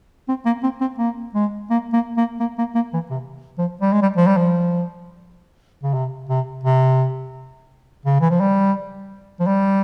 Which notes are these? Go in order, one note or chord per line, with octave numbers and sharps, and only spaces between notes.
C4
A#3
C4
C4
A#3
G#3
A#3
A#3
A#3
A#3
A#3
A#3
E3
C3
F3
G3
G#3
G3
F3
G3
F3
C#3
C3
C3
C3
C#3
E3
F3
G3
F3
G3